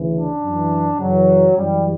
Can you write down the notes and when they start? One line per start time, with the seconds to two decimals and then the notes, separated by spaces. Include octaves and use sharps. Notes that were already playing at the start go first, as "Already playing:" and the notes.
Already playing: D2 C#3 E3
0.12 D4
0.40 F#2 E3
0.98 F#2 C#3 E3 F#3
1.56 F#2 E3 G3